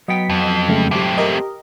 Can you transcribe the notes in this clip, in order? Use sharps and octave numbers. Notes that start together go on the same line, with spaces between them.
F#3 B3 D#5 G5 B6
F2
C#3 G#3 A3
A3 C4 G4 D6
G4 A#4 D#5